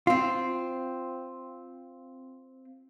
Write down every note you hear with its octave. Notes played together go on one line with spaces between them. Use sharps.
C4 F4